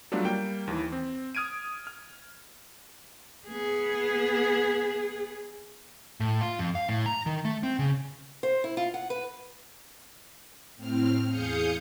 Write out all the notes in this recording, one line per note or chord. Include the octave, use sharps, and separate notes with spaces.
F#3 G3 A3 B3 D4 F4
G3 A#3 G5
D#2 E3
C4
D#6 F6 G#6 D7 D#7
F6
B3 G#4
A2
F4
F2
F5
A2
A#5
D#3
A3
C4
C#3
C5
E4
F4
F#5
B4
A2 C4 F6
E2 G#4 F5 D#6 G6 C#7